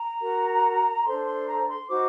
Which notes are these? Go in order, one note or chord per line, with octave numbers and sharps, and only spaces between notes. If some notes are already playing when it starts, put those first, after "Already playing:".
Already playing: A#5
F#4 A#4
D4 A4 C5 C6
C6
A#5
C6
D#4 F#4 C5 D6